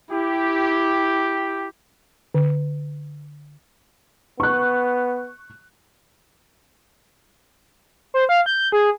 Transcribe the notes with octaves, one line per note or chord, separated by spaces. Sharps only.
E4 G4
D3
B3 C#6 F#6
C5
F5
G6
G#4